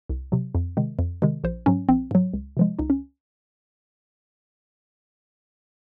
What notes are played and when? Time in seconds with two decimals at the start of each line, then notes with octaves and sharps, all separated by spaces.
0.09 C2
0.32 C3 F#3
0.55 F2
0.77 C3 D#3 G#3
0.99 F2
1.22 C3 D#3 G#3
1.44 A#1 C5
1.66 G#2 F#3 C#4
1.89 A#1 C4
2.11 G#2 F#3
2.34 C#2
2.57 C3 F3 G#3
2.79 C#2 D#4
2.90 C#4